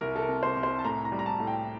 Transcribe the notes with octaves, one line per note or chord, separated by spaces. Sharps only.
C2 A#4
A4
A#4
C3
C5
C2
C5
A5
A2 A#5
A#5
G3
A#5
A5
A2
G5